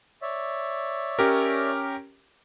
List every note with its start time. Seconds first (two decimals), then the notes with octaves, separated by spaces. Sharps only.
0.22 C#5 D5 E5
1.19 C#4 G4 A#4